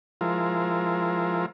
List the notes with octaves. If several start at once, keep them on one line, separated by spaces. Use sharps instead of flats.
F3 G#3 E4 F4 A#4 C5